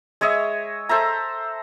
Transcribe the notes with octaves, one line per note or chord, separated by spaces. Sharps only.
G#3 C#5 D#5 E5
A4 C5 E5 A#5